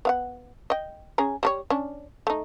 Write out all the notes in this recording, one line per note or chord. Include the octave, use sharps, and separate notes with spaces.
B3 F5 F#5
D#5 G5
C#4 G#4 A#5
G3 A4 C#5
C#4 D4
A3 D#4